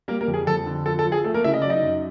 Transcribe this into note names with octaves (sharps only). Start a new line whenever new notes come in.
G3 A#3 A#4
A#3 A#4
F2
G#4
F2 A4
D3
F3 A4
A4
F3
G#4
A3 A4
A#3 A#4
C#3 E4 E5
D#5
F#3 D5
D#4 D#5
F#2